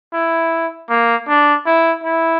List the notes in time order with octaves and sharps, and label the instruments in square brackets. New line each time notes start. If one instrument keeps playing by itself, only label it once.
[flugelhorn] E4
A#3
D4
E4
E4